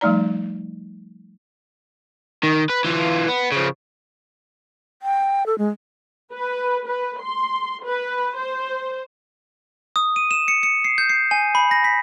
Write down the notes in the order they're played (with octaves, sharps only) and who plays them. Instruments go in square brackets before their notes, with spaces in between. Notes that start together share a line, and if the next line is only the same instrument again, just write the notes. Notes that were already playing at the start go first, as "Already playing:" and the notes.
[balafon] F3 G3 A3 D#4 D5 A#5
[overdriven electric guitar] D#3
B4
E3 F4
B3
C#3 F3
[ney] G5
A4
G#3
[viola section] B4
B4
C6
B4
C5
[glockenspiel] D#6
D#7
E7
C#7
C#7
C7
G6
C7
G#5
B5
A#6
B6